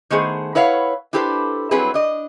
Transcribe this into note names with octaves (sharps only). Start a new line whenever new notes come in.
D#3 A3 B3 G#4 A4 C5
E4 B4 C#5 F5 F#5
D4 E4 G4 A4 B4 C5
F#3 G3 C4 E4 G#4 B4
D4 D#5